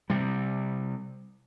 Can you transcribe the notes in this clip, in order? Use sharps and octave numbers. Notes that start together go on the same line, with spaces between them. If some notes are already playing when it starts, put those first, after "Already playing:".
C3 G3